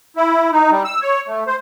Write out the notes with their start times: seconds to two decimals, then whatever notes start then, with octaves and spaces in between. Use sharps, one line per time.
0.16 E4
0.52 D#4
0.71 G3
0.85 E6
1.01 C#5
1.28 A3
1.47 C5